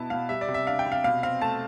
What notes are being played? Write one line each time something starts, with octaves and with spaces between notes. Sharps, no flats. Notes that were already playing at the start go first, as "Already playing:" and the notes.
Already playing: B2 B3 E4 A5
B2 F5
G3 E5
D5
C3
E5
D4 F5
G5
C3
F5
B2 F5
C4 F5
A3 A5